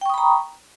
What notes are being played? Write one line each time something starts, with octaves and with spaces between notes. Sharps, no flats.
G5 A#5 B5 C#6 D#6